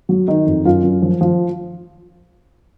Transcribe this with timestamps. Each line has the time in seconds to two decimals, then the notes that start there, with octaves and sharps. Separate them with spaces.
0.09 F#3
0.28 D#3 D#4
0.46 F2
0.65 F#2 F4
0.84 F#2
1.02 F3
1.21 F3